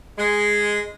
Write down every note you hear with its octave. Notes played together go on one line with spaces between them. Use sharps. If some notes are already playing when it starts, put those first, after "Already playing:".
G#3